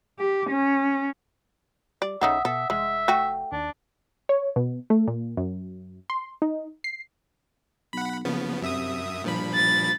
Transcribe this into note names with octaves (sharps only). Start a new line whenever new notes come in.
G4
C#4
G3 D5
B1 C#3 D#4 A4 E5 F#5 D#6
B2 A4 E5
F1 G#3 E5
A3 F#4 G5
D#2 D4
C#5
B2
A3
A#2
F#2
C6
D#4
C7
B1 F#5 B5
F#1 C#3 F3 B3
F#2 C3 E5 D#6
G2 A#2 F3 B5
A6